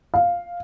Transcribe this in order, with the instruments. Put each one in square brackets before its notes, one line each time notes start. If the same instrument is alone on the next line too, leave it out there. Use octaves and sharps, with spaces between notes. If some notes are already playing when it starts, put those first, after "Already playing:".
[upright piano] F5